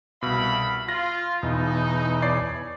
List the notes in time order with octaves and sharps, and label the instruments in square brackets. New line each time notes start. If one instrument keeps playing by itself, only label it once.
[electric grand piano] C2 B2 [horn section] E5 F5 B5
[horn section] F4 [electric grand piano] A#6
[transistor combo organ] E2 B2 [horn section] D#4
[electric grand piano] C#5 D5 C7